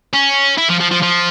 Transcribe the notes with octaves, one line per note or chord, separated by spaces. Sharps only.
C#4
E4
F3
F3
F3
F3